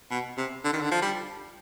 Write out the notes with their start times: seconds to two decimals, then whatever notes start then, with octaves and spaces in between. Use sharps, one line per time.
0.11 B2
0.38 C3
0.64 D3
0.73 D#3
0.82 D3
0.91 F3
1.02 G3